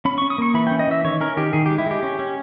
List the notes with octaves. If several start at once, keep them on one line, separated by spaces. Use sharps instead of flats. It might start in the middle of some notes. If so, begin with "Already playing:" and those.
C#4 B5
C#6
C#4
D#6
A#3 C#6
E3 B5
G5
C#4
D#5
E3 E5
D#3 C#5
C#4 A#4
D#3 G4
D#3 G#4
G4
G#3
E4
G#3 G4
C#4
C#4